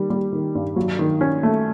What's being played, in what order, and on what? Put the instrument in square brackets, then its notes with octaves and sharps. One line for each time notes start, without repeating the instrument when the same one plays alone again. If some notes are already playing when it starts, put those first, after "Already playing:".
Already playing: [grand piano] D#3 G3
G3
D#3
G2
F#3
D#3
C#4
A3